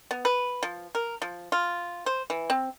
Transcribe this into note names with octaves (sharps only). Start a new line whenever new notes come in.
B3
B4
F3
A#4
F3
F4
C5
E3
C4